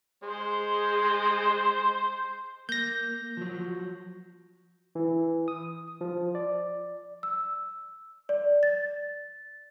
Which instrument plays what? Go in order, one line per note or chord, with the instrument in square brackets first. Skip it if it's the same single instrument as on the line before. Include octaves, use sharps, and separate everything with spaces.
[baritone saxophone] G#3 [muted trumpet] C5
[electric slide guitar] A#3 [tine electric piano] G6 A#6
[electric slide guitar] F3 F#3
[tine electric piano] E3
D#6
F3
D5
[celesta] E6
D5
A6